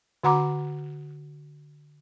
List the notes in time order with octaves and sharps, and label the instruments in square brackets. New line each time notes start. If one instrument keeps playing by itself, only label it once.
[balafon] D3 F#4 F#5 A#5 B5 D6